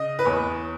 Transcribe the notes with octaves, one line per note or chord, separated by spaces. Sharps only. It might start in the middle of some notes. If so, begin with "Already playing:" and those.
Already playing: C#3 D#5
B4
E2 C#5